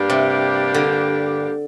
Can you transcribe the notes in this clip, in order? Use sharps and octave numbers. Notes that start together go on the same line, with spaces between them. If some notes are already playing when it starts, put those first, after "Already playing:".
Already playing: G2 G3 A#3 D4 G4
C3
D3